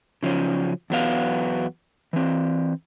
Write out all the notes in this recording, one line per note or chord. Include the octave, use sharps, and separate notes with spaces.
C#3 F3 F#3 C#4
E2 F#3 B3 F5
E3 C4